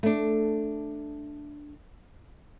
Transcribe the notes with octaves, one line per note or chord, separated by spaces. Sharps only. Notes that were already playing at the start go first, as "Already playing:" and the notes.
A3 D4